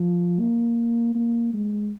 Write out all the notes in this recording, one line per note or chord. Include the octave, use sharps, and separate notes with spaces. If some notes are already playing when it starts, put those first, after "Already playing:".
Already playing: F3
A#3
A#3
G#3